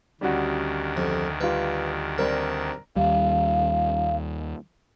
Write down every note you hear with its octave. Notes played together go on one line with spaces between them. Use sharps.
D2 D#3 G3 C#4 F#4
F2
G3 F4 B4
G3 C4 A#4 D5 A#5
D#2 G3 F5